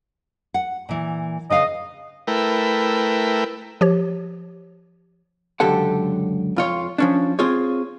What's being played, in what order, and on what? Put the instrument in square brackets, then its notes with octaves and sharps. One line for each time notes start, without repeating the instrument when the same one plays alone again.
[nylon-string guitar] F#5
A#2 E3
[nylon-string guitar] C#3 B4 F5 [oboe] D#5
[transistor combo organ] A3 E4 A#4 B4 G5
[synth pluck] F3 G4 C#5
[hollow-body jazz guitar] C#2 F#2 D3 G4 A4 F#5
F2 F4 C#5
F3 C#4 D4
C4 F4 G#4 C#5